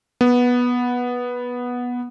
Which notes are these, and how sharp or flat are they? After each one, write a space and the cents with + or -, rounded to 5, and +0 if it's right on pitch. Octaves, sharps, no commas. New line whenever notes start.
B3 -10